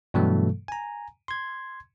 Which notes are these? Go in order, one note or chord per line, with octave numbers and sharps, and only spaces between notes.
G2 B2 E3 F#3 A3 A4
G#5 A#5
C6 G#6